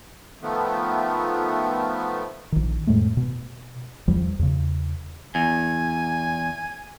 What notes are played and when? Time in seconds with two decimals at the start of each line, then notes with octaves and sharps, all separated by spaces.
0.42 D#3 F3 A3 B3
2.52 A#1 D#3
2.87 F2 A2 G#3 A3
3.17 B2
4.08 E2 F3 G3
4.39 E2 C#3
5.35 E2 G#5